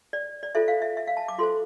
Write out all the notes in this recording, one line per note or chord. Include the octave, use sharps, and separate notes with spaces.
D5
D5
F4 A4 C5 E5
F5
E5
E5
F5
A5
D6
F4 A4 C5 C6